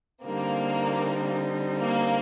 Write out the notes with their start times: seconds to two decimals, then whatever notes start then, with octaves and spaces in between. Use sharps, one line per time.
0.24 D3 G3 A#3 C4 D#4
1.80 A#3